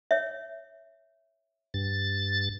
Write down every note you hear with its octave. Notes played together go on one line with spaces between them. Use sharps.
C#5 E5
G2 A6